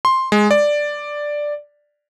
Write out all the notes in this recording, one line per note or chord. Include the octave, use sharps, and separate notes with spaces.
C6
G#3
D5